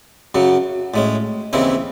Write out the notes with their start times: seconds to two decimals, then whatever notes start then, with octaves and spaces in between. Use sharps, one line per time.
0.35 F#2 C#3 F#3
0.94 A2 G#3 C#4
1.53 D#2 C#3 E3 C4 E4